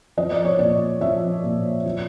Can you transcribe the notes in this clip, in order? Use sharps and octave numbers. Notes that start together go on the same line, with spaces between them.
F3 D#5
D5
C#5
A#2 D5
F3 E5
A#2
F3